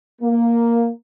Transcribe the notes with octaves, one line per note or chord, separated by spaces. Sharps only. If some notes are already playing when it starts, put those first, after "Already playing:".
A#3